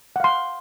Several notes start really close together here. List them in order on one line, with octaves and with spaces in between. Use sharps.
F#5 F5 C6